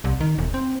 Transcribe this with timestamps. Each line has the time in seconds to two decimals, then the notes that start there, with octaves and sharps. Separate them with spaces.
0.04 C2
0.21 D#3
0.38 E1
0.54 C4